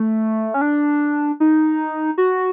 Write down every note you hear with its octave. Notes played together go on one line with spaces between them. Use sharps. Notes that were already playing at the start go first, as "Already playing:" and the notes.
Already playing: A3
C#4
D4
D#4
F#4